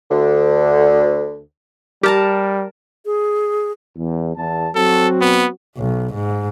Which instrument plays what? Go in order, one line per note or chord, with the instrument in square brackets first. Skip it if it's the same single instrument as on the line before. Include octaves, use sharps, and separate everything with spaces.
[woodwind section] D2 D3
[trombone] G3 [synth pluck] G4 [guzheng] A#4 A5 A#5
[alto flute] G#4
[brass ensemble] E2
E2 A5
[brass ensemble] F#3 C4 F#4 [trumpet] A4
[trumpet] B3
[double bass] B1
G#2